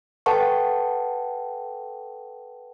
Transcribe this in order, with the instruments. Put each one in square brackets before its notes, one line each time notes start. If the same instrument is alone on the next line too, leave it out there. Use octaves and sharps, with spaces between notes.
[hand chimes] A4 B4 F#5 G5 A5 C#6